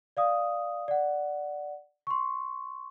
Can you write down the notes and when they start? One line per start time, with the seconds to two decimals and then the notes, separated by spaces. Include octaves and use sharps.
0.17 D5 F5 D#6
0.88 D5 F#5
2.07 C6 C#6